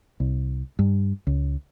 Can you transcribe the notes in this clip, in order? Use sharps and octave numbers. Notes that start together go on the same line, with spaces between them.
C2
G2
C#2